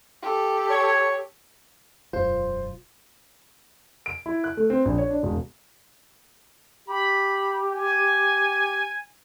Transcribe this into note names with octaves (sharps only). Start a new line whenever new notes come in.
G4 A4
C#5
E1 F#2 F4 C5
D7
E4
F#6
A3
C4
A#1
C#5
D4
E1
G4 B5
G#5